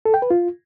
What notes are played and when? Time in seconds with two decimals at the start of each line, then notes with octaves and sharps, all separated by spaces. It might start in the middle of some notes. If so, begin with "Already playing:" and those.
0.05 A4
0.14 G5
0.22 B4
0.31 F4